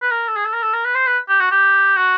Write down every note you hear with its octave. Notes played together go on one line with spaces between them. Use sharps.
B4
A#4
A4
G#4
A4
A#4
A4
A#4
B4
C5
B4
G4
F#4
G4
F#4